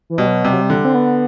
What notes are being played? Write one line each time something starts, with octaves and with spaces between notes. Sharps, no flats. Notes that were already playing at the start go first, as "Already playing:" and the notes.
E3
B2 G3
F#3
C3 G3
F#3
G3
D3
C4
B3